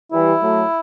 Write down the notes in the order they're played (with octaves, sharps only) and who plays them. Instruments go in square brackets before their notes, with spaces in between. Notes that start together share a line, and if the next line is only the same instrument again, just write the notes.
[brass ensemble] E3 G3 [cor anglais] E4
[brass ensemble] F#3 A3